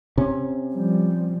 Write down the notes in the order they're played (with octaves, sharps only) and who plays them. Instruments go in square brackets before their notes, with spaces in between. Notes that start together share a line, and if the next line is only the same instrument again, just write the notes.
[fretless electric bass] C3 C#4
[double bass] F3 G3